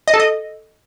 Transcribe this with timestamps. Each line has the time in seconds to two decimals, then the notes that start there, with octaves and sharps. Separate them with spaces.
0.08 D#5
0.14 A4
0.20 D#5